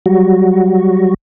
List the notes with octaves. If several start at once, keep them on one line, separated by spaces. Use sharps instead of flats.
F#3 G3 F#4